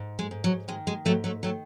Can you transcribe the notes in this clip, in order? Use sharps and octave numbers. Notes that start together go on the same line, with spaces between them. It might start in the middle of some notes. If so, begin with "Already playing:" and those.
Already playing: G#2
G#3
G#2
F#3
D#3 G#3
G#3
G#2 F#3 A3
F#3 A3
D#3 F#3 A3